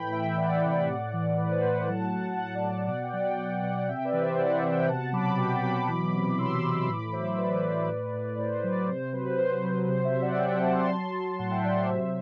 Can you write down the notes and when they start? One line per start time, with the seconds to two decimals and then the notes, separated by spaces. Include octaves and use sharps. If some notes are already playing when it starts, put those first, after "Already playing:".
Already playing: A2 E3 G5 B5
0.12 E3 E5 G5
0.38 E3 D5 F#5
0.63 C3
0.88 A2
1.13 E3
1.37 E3 B4
1.50 C5
1.62 A2 B4 D5
1.75 D5 F#5
1.88 F#3 F#5 A5
2.12 F#3 F#5 A5
2.37 A2 F#5 A5
2.55 D5 F#5
2.63 F#3
2.71 D5 F#5
2.87 B2 D5 F#5
3.03 G5
3.13 F#3 D5 F#5
3.30 G5
3.38 B2 D5 F#5
3.63 B2 D5 F#5
3.88 C3 E5 G5
4.04 B4 D5
4.13 E3
4.21 C5 E5
4.38 C3 D5 F#5
4.55 C5 E5
4.63 C3
4.72 E5 G5
4.88 B2 F#5 A5
5.12 F#3 B5 D6
5.38 B2 G5 B5
5.63 F#3 B5 D6
5.88 E3
6.13 C3
6.38 E3 C6 E6
6.64 E3
6.88 A2 B5 D6
7.13 F#3 C5 E5
7.38 A2 B4 D5
7.63 A2
7.88 A2
8.14 A2
8.28 D5
8.38 A2 C5
8.55 B4
8.64 F#3
8.71 B4 D5
8.88 C3 C5
9.13 F#3 B4
9.38 F#3 C5
9.63 F#3
9.88 C3 C5
10.05 C5 E5
10.13 C3
10.22 D5 F#5
10.39 C3 E5 G5
10.55 F#5 A5
10.64 C3
10.71 A5 C6
10.88 F#3
11.13 F#3
11.38 A2 F#5 A5
11.51 E5 G5
11.63 F#3 D5 F#5
11.76 C5 E5
11.89 C3